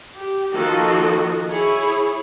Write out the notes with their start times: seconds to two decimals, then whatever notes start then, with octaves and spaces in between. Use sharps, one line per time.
0.16 G4
0.53 D#3 F3 A#3 F#4 A4 D#5
1.49 E4 G#4 C#5